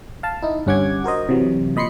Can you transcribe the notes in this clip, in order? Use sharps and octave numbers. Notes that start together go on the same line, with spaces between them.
F5 A5
D#4 E4
G1 G2 C#4 F#5 D6 G#6
F#4 A#4 C5 D#5
C3 E3 F#3
A#2 D#5 B5 C6 C7 C#7